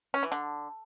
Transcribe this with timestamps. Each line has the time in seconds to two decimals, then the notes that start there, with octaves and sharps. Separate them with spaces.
0.14 C#4
0.23 E3
0.32 D3